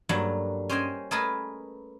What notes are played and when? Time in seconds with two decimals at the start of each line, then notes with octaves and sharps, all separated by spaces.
0.09 G2 F#3 A3 A#3 D4
0.69 C#4 C5 D#5 G5 G#5
1.11 A3 G#4 A#4 B4 D#5 A5